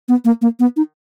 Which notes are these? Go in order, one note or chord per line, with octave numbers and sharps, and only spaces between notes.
B3
A#3
A#3
B3
D#4